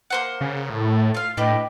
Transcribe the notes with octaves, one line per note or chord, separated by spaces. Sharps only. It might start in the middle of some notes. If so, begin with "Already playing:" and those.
A#3 C5 F#5
C#3
A2 A4
F4 F5
A2 D4 G4 B4 D#5 G5